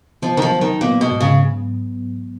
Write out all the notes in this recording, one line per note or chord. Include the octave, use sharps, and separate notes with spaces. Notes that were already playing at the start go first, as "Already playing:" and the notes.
F3 B3
D#3
F3
F#3
D#3
A#2 B3
B2
G#2
C#3